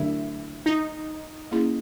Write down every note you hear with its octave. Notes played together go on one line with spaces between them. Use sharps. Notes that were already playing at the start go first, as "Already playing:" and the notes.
Already playing: D3 F#3 A3 D4 E4 G4
D#4
A#3 C#4 E4 G#4